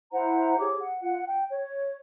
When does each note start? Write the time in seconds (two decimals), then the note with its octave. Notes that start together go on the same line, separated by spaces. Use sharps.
0.12 E4 C5 F#5 A#5
0.59 G4 G#4 C#5 D6
0.80 F#5
1.02 F4 F#5
1.27 G5
1.50 C#5